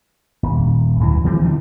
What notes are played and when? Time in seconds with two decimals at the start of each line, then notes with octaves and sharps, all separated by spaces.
0.43 D#1
1.00 D2 E3 F#3
1.25 E3 G3 G#3 C4
1.42 D3 E3 F3 G3